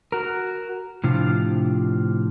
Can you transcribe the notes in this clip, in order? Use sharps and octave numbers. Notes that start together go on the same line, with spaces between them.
F#4 A#4
A2 C3 F3 D4 F4